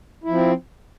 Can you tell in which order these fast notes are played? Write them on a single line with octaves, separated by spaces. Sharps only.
E4 F3 C4